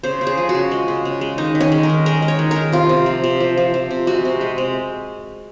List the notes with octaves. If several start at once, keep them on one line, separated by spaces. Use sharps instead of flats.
C#3 C5
C#3
G#4
F3
F#4
C#3
G#3
C#3
C#3
G#3
D#3 D#4
D#3
C#4
G#3
A#4
D#3
G#3 A#4
G#3
C#5
D#3
D#3 A#4
C3 F4
C3
F3
C3
F3
F3
F3
C3
G#3 F#4
C3
G#3
C3